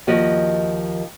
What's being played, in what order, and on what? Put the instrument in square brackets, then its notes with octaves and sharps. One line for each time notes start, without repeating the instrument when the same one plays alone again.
[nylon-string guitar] D#2 F3 F#4 D#5